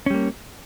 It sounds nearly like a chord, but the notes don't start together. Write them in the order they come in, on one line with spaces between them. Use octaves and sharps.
C#4 G3 A#3